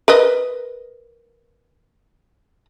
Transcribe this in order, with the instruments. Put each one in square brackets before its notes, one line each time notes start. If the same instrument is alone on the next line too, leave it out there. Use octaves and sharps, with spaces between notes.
[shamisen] A#4 B4 D#5